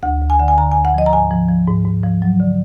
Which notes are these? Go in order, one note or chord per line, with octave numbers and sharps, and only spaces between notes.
D2 F#5
D2
G#5
D3 F#5
G#5
D3 A#5
D2 G#5
F#5
F3 D#5
A#5
G#2 G#5
F3
F3
G#2
G#2
F3
F#3
D3